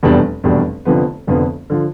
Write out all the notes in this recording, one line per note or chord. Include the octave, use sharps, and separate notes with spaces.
F1 E2 B2 G3 D4
F1 E2 B2 G3 D4
F1 F2 D3 F3 B3
F1 F2 D3 F3 B3
D3 F3